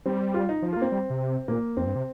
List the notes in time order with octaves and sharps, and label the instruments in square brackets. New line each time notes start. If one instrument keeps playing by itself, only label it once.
[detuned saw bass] G3 [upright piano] C4
[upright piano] F4
D#4
[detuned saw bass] F3
[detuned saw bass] A#3 [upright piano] F4
[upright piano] C4
[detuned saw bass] G3
C3
[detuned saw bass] A#2 [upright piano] A#3
[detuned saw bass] F2 [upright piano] C4
[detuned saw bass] G2
C3